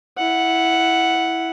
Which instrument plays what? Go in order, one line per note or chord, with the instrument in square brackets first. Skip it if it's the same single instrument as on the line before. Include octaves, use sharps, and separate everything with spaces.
[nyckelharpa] E4 F#5